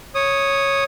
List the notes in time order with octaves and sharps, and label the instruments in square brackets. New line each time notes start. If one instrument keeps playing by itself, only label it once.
[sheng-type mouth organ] C#5 D#6